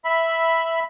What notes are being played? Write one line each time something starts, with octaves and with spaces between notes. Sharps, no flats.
E5 B5